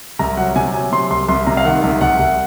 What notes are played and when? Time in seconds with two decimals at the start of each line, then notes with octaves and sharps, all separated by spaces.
0.19 C2 A#5
0.37 F#3 F#5
0.56 C3 G#5
0.74 F#3 G#5
0.92 C3 C6
1.10 C2 C6
1.28 C2 C6
1.47 C3 A#5
1.57 F5
1.65 D#3 F#5
1.83 C2
2.01 C2 F#5
2.19 C2